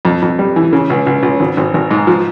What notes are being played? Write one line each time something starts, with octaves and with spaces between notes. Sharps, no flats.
F2
F2
G3
E3
C#3
C#2
C#2
C#2
G#1
G#1
G#1
G#2
F3